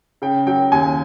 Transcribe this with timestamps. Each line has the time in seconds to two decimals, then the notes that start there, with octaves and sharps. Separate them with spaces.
0.22 C#3 G5
0.46 F#3 G5
0.72 D#2 G#5